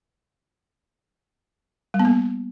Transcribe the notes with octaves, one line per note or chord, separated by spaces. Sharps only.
G3
B3
A#3